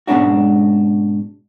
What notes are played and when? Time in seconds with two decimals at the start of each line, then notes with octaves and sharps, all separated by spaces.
0.07 G#2 B2 G#3 C#4 D4 F#4